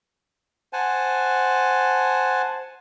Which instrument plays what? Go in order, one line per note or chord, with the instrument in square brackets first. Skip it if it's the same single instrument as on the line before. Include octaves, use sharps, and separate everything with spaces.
[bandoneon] C5 F#5 G#5 A5